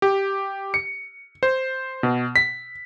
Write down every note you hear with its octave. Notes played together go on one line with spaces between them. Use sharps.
G4
C#7
C5
B2
B6